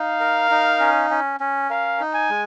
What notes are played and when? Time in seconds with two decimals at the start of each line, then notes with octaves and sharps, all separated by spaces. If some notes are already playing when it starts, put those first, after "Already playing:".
Already playing: D#4 F5
0.20 A#4
0.51 D#4
0.80 C#4
1.10 C#4
1.40 C#4
1.70 A#4 F5
2.00 D#4
2.14 G#5
2.29 G#3